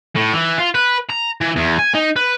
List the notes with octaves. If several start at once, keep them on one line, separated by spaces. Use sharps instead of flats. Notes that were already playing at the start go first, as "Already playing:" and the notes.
A2
E3
F4
B4
A#5
E3
E2
G#5
D#4
B4